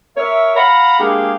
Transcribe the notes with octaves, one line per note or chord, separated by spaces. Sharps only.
A#4 C#5 E5
F5 F#5 A#5 B5
G#3 A#3 D4 G4 G#4 F5